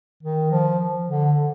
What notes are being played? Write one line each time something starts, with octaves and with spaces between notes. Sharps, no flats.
D#3
F3
D3